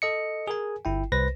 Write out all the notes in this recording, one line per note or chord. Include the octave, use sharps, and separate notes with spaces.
A4 D#5 C#7
G#4 A#4 G#5
G1 E4 G5
C2 B4 C5 A#6